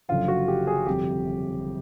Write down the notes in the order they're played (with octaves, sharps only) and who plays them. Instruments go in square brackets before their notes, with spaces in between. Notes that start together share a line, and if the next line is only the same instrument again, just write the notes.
[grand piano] F#1 F#2 D3 F3 F4
F#4
G4
G#4
G1 F2 C3 G4